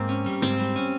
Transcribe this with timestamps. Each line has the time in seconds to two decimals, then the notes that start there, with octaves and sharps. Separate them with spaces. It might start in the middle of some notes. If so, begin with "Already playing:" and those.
Already playing: G#2 A#3 C4
0.09 C#4
0.26 G3
0.42 G#2 C4
0.59 G3
0.76 C#4